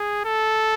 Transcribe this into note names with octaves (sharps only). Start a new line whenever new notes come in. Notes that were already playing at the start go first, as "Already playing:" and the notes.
Already playing: G#4
A4